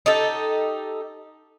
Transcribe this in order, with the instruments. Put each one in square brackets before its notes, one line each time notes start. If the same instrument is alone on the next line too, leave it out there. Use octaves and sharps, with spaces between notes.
[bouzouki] D#4 G4 A4